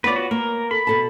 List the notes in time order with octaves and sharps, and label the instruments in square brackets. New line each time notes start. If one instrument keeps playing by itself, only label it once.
[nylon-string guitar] B3 F4 C#5 [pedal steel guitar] B4 D5
[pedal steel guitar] F#4
[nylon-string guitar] A#3 [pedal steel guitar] A#4
[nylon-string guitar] A4 [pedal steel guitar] B5
[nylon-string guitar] B2 A4 A5